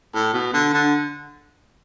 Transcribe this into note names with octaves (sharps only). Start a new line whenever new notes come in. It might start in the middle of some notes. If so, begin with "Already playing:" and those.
A2
B2
D3
D3